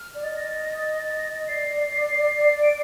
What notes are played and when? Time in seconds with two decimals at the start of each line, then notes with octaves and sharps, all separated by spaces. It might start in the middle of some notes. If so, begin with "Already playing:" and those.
Already playing: F6
0.15 D5
0.23 D#5 A6
0.36 A#6
0.50 A6
0.63 A#6
0.76 A6
0.91 A#6
1.04 A6
1.18 A#6
1.31 A6
1.48 D5 C7
2.62 D7